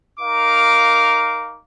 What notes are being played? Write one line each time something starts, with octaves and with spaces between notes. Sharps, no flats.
D#4 A#4 F5 D6